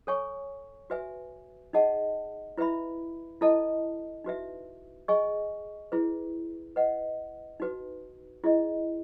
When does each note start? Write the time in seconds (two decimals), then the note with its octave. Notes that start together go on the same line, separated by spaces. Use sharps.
0.07 A4 C#5 G#5 C#6
0.90 F#4 B4 E5 G#5
1.73 D#4 G#4 D#5 F#5 A5
2.57 E4 B4 E5 B5
3.41 E4 A4 D#5 A5
4.24 D#4 F#4 B4 E5
5.08 G#4 D#5 G#5 C#6
5.92 E4 G#4 B4
6.76 B4 D#5 F#5
7.60 D#4 F#4 B4
8.44 E4 G#4 D#5